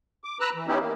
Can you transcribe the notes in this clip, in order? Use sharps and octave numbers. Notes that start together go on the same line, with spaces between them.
D6
B4 A#5 E6 F#6
E3
B3 C#4 D#4 E4 G4
A#3